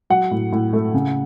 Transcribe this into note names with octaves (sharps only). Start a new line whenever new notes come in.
F#3 F#5
A2
A2
A3
C#3